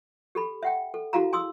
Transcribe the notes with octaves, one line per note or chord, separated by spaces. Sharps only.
G4 A4 B5
E5 F#5 G5
A4
E4 F#4 G#4 F5 A5 A#5
G#5 C6 D#6 E6